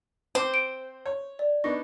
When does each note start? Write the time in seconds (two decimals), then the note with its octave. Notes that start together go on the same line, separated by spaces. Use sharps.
0.35 C4 C5 D6
0.54 D7
1.06 C#5
1.39 D5
1.64 B3 D4 D#4 C#6 A#6